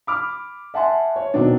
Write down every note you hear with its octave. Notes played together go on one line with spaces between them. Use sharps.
B5 D6 F6
E5 F#5 G#5 A5 C6
C#5
B2 D#3 F#3 C4 D4